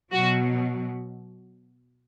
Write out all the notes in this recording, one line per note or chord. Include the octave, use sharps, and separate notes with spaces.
B2 F#3 F#4